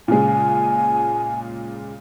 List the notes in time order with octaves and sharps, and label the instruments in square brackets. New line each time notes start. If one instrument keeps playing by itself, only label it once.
[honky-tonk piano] A#2 C#3 G#3 [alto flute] G#5